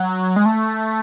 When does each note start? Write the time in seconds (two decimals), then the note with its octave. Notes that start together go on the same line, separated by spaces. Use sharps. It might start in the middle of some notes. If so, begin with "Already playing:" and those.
Already playing: F#3
0.36 G#3
0.46 A3